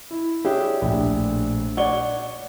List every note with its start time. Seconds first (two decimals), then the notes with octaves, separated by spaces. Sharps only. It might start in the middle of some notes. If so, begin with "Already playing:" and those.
0.11 E4
0.45 D4 G4 G#4 C#5 E5
0.81 A#1 A2
1.77 C#5 D5 F#5 G7